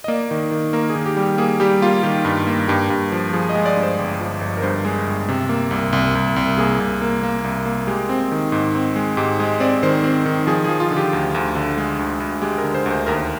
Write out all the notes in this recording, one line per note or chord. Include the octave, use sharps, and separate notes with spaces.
D#5
A#3 D5
D#3
D#3
A#3 A#4
G#4
D#3
G4
G3
G4
A#3 G#4
G3 G4
A#3 F4
D#3 G4
G2
A#3
G2 G4
G2
F3
F3 G#4
D#5
G#3
D5
G2
C5
G1
F3
G1
A#4
G2 C5
G#3
G1
C3
A#3
C2
C2
C2
C2
A#3 G#4
C2
A#3
A#3
C2
A#3
G#3 G4
C4
D#3
G#2
C4
G#3
G#2 G4
G#3 D#5
C4 D5
D#3 C5
C4
D#3
F3 G#4
G#4
F3
F4
D3
G4
D2
D2
D3
G#3
D2
D2
G#3 G4
A#4
D3
C5
D2 C5
D#2 A#4